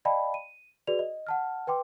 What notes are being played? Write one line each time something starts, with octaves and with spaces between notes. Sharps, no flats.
D5 D#5 F5 G5 A5 B5
D#7
F#4 G#4 B4 D5 F7
D#5
F#5 A5 F6
B4 G5 C6 D6